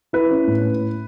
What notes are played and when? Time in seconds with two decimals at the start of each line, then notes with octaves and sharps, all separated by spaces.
0.13 E4 B4
0.31 C#4
0.47 A2